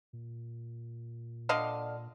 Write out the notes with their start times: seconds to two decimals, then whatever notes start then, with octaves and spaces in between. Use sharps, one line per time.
0.13 A#2
1.49 D3 D#5 F5